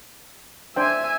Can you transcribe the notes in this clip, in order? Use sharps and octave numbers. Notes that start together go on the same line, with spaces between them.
D4 C5 E5 G5 G#5